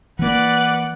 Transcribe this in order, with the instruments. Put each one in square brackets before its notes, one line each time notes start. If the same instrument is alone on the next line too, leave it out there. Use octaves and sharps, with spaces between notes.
[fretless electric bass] E3 A#3 [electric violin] B4 D5 [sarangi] F#5